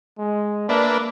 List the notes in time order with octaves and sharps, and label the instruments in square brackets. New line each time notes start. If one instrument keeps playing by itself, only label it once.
[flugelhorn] G#3
[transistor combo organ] A#3 B4 D5 [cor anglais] D4 [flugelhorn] E5